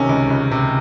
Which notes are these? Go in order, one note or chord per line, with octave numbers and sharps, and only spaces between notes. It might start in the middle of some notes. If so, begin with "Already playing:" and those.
Already playing: C3 D#3 C#4
C#2
C#2
C3